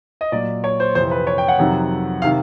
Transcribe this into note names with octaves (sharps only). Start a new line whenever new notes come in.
D#5
A#2 F#3 D5
C#5
C5
F2 C3 E3 C5
B4
C#5
G5
F#5
F2 C3 D#3 F#3
C3 D#3 F5